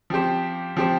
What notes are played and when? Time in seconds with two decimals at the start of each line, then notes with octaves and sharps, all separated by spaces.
0.10 F3 C4 G4 C5
0.77 F3 C4 G4 C5